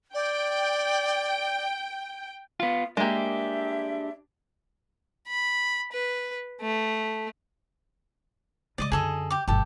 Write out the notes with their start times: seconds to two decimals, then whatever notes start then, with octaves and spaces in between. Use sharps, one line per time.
0.14 D5 G5
2.60 B3 F4 F5
2.97 G#3 A#3 D4 G4 E5
5.28 B5
5.92 B4
6.61 A3
8.78 C#3 G#3 D5 D#5 D6
8.92 F#2 D3 G#4 A4 D#5
9.31 G4 D6
9.48 G1 B2 G4 A4